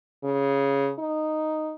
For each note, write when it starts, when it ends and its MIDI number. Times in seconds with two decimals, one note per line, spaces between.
0.24 0.91 49
0.99 1.75 63